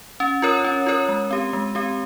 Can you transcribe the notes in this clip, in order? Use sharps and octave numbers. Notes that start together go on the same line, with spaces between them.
C#4
F4 A#4 C#5
C#4
F4 A#4 C#5
G#3
C4 G4
G#3
C4 G4